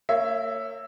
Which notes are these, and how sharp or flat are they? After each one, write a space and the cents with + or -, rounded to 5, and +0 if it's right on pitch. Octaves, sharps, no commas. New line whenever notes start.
A#3 -35 C#5 -5 E5 +5